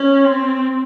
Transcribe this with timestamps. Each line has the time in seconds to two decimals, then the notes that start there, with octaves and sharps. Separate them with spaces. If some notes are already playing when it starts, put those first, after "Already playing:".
Already playing: C#4
0.24 C4